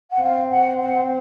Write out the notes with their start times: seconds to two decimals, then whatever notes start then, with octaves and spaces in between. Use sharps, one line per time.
0.12 F#5
0.21 C4 F5
0.51 F#5
0.80 F#5